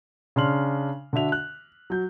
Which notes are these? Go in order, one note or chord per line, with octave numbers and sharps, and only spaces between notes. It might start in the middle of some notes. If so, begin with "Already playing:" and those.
C#3 D4 C6 F6 F#7
D3 D4 F#4 E5 F7
F#6
F#3 G6